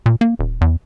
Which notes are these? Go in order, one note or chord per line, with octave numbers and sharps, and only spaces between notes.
A#2
A#3
D#1
E2